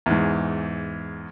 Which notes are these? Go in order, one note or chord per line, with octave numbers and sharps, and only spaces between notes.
E2 G#2